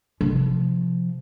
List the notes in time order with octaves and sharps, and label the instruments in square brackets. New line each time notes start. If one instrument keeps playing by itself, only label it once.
[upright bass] C3 F3